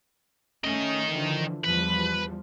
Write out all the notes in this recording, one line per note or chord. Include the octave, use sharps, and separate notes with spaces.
D#3 A3 C#4 D#5
D3 E3 F3
E2 F3 G3 B4